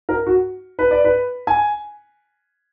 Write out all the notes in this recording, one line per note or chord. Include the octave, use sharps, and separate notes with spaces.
A#4
F#4
B4
D5
B4
G#5